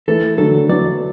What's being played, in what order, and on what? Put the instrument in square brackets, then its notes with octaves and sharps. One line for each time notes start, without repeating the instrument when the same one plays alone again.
[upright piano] E3 A3 [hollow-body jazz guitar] A4
[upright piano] D3 F#3 [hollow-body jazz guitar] A4
[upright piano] F#3 B3 [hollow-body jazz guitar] D5